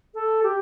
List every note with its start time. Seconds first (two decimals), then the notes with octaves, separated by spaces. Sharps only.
0.14 A4
0.43 G4